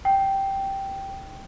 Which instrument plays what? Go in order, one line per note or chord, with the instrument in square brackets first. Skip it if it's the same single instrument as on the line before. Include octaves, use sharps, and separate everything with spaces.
[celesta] G5